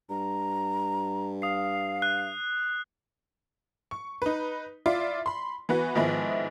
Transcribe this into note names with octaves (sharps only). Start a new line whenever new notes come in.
G2 A#5
F5 D#6 C7
F#6
C#6
D#4 B4
E4 F4 D5 E5
B5 C6
E3 B3 F#4 B4
G#2 D#3 F3 G#3 B3 E4